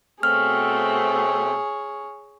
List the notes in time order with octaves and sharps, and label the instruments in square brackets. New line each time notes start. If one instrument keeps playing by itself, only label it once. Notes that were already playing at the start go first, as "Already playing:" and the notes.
[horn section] B2 A3 C4 [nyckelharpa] G#4 C#5 [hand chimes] F6